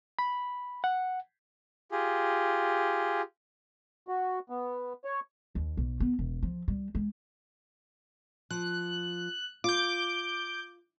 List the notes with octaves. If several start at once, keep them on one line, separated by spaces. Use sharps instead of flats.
B5
F#5
F4 G4 G#4
F#4
B3
C#5
D#2
B1
B3
E1
F3
G3
G#3
F3 F#6
F4 D6 G6